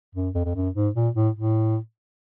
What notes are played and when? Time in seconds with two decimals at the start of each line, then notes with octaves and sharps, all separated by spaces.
0.15 F#2
0.35 F2
0.45 F2
0.55 F#2
0.75 G#2
0.95 A#2
1.15 A2
1.35 A2